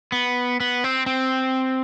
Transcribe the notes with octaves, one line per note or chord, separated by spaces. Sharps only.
B3
B3
C4
C4